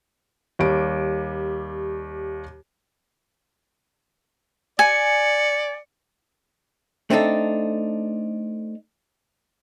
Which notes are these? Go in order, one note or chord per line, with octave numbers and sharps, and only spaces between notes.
D#2 G3 G4 D7
D5 G#5 C#7
A3 C4 D4 D#4 A4